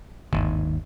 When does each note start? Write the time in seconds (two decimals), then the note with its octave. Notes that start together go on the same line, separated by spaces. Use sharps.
0.33 G1 D#2 G#2 D#3